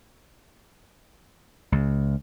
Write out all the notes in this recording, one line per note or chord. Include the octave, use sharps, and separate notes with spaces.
C#2